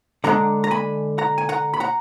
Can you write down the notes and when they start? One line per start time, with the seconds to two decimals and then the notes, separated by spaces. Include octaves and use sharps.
0.24 D3 G#3 B3 D4 F#5 A#5
0.64 A#5
0.71 G#5 B5
1.18 F#5 A#5
1.38 G#5
1.49 F#5 A#5
1.74 B5
1.80 F#5 A#5